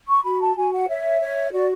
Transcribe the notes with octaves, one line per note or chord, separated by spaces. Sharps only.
C#6
F#4 B5
A5
F#4 G#5
F#5
C#5 E5
C#5
F#4 D5